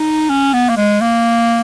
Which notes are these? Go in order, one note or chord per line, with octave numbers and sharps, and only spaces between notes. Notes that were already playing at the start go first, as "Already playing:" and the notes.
Already playing: D#4
C#4
B3
A#3
G#3
A#3